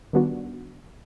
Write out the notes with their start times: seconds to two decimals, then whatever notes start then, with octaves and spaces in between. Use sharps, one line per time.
0.13 D#3 G3 B3 D4 F#4